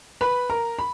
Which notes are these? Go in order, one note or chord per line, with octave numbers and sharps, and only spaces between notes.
B4 B5
A#4 A#5
B5